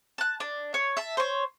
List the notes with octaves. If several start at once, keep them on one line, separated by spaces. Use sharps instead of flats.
A5 F#6
D4
C#5
E5 A5
C5 C#5